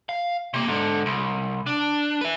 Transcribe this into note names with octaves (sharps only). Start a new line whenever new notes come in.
F5
C3 A#3
G#2 D3
C2
D4
B4 E5